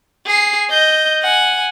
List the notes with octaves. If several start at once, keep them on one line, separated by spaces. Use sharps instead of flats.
G#4 C7
D#5 G6
F#5 G#5